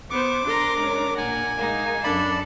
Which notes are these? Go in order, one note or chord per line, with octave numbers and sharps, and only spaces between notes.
B3 C5 C#6 D6
D4 A#4 A#5 C6
G#3 C#4
A#2 F#5 G#5
G#3 A#3 D#4
F#2 D4 A4 D5 B5